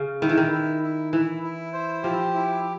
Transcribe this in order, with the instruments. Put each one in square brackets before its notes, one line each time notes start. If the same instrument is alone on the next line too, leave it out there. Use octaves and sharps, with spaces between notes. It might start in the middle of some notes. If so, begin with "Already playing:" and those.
Already playing: [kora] C#3
[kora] D#3 [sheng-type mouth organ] E4
[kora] E3
D#3
[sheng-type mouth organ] E4
E4
[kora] E3 [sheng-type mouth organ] E4
[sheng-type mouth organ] E4
C5
[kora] F3 [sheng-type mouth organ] G4
[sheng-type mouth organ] E4